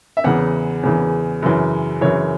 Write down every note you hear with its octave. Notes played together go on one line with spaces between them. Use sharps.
E5
E2 C#3 E3 F#5
E2 C#3 E3
F#2 C#3 E3
F#2 C#3 E3 C#5